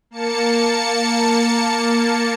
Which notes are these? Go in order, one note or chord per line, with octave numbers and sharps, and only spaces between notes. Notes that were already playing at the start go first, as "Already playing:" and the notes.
A#3 A5 C#7